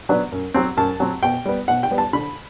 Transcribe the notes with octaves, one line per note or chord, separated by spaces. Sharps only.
F#3 B3 D4
F#2
F#3 C4
F#2 A5
F#3 C4
B2 G5
G3 B3
B2 F#5
G5
G3 B3
A5
D3 B5